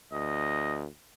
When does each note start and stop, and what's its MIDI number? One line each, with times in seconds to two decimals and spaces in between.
0.12 0.87 38
0.12 0.79 75